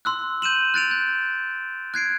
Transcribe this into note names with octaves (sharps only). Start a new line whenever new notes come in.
C6 E6 F#6
G6 D#7 E7 F#7
F#6 A6 D7 F7
G6
F#6 G#6 C7 D7